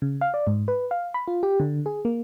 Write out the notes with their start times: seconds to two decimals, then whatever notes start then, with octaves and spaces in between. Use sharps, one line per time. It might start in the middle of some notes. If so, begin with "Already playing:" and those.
0.02 C#3
0.21 F5
0.34 D5
0.47 G#2
0.68 B4
0.91 F5
1.14 B5
1.28 F4
1.43 G4
1.60 D3
1.86 G#4
2.05 A#3